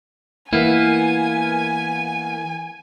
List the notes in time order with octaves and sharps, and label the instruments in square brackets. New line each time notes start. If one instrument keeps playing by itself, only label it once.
[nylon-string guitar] E3 E4 [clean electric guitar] A#3 B3 [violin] G#5